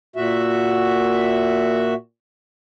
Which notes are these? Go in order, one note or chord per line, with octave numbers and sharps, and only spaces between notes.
A#2 F#4 E5